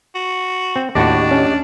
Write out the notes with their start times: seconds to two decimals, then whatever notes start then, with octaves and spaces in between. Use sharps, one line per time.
0.15 F#4
0.76 C4
0.95 D#2 A2 D4 F#4 G4 D#5
1.31 C#4